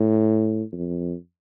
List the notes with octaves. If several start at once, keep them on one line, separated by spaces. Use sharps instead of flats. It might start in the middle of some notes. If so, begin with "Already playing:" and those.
Already playing: A2
F2